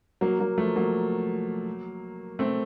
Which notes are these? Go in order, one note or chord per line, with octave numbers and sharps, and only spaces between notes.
F#3 A#3
F#3 A#3
F3 A3
F#3 A#3
A3 C4